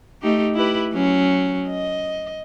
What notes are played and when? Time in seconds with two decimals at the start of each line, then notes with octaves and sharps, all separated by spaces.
0.22 A3 D#4 G4
0.54 E4 G4 B4
0.93 F#3 C#4
1.68 D#5